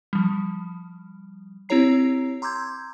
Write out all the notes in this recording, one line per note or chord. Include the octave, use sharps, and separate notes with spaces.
F3 G3
C4 E4 G4 C#5 A#5 C7
A#5 C6 D6 E6 G6 G#6